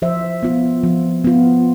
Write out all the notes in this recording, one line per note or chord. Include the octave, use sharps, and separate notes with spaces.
F3 C5 E5
B3 F4
F3
B3 F4